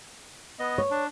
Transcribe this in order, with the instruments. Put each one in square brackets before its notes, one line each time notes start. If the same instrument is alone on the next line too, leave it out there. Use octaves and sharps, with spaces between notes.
[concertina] B3 D#5
[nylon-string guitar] C#5
[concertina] D4